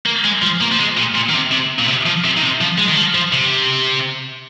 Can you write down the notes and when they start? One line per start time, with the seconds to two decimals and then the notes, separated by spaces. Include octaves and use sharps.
0.06 A#3
0.24 G#3
0.42 F3
0.61 A#3
0.72 F3
0.79 G#3
0.97 A#2
1.15 A#2
1.29 D#3
1.34 C3
1.51 C3
1.79 A#2
1.88 C3
2.06 F3
2.24 C3
2.37 D#3
2.42 C3
2.61 F3
2.78 G#3
2.88 D#3
2.97 F3
3.15 F3
3.33 C3